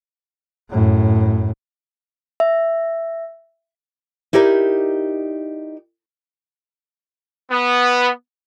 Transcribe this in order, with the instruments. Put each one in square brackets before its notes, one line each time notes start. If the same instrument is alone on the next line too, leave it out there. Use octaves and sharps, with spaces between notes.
[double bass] F#2 A2
[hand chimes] E5
[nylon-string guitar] D#4 E4 G4 A#4 D5
[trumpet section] B3